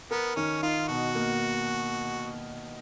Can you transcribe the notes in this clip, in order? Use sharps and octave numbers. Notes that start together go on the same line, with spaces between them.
B3 A#4
D#3 C#4
D#4 F4
B2 F#4
A#3